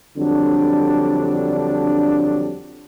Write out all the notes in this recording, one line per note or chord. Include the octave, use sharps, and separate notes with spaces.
F2 D3 F#3 G3 D4